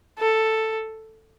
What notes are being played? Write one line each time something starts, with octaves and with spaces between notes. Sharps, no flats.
A4